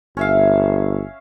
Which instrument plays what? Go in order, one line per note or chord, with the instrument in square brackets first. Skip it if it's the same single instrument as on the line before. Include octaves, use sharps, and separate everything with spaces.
[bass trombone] G1 [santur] C#4 E5 F5